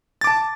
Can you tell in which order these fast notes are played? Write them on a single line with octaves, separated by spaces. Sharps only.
A6 D6 A5